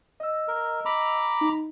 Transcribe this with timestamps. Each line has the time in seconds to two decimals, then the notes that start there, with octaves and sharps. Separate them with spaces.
0.20 D#5 E6
0.48 A#4
0.85 A#5 B5 D6
1.41 D#4